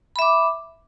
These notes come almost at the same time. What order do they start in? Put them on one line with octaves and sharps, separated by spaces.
B5 E5 D6